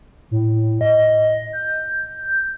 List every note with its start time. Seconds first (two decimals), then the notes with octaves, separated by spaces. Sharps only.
0.31 A2
0.81 D#5
1.53 G6